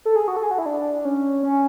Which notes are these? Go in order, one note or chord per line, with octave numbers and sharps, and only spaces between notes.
A4
G#4
F#4
A4
G#4
F#4
E4
D4
C#4
C#4